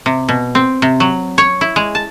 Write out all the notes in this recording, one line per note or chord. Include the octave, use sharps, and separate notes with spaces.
C3
B2
C4
C3
F#3
C#5
E4
G#3
A5